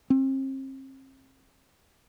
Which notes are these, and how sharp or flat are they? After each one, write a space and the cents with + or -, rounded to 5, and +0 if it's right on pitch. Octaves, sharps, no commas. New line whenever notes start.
C4 +40